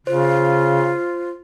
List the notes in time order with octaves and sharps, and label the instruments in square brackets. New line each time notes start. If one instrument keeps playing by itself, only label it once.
[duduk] C#3 [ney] F4 [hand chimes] C5